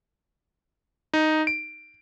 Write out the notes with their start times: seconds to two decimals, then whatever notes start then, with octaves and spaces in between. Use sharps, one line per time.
1.14 D#4
1.47 D7